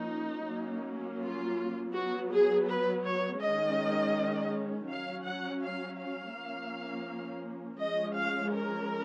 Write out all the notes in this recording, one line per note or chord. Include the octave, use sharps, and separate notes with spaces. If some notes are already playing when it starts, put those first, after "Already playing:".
Already playing: F3 A#3 C#4 D#4
F#3 A#3 C#4
F4
F#3 B3 F#4
G#4
B4
C#5
D#3 G#3 C#4 D#5
F#3 C#4 F5
F#5
F5
F5
F3 A#3 C#4
F3 G#3 C#4 D#5
F5
A#4